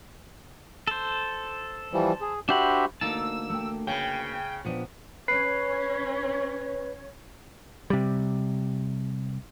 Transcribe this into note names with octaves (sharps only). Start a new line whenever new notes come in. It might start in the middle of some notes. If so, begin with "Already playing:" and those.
A4 C5
E3 F3 G3
G#4
D4 F#4 G4 C5 E5 B5
D2 A3 A#3 D#4 A5 E6
A3 G5
C#3 B4 C#5 G5
A#2 F3 B3 D4 G4
C#4 B4 C#5 C7
C3 G3